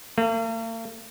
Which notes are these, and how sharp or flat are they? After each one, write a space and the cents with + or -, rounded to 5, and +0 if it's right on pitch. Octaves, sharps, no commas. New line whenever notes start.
A#3 -45